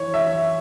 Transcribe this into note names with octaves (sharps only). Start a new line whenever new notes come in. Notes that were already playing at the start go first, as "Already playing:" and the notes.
Already playing: E3 C#5
E5